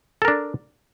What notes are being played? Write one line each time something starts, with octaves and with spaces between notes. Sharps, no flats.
D4 A4 A#4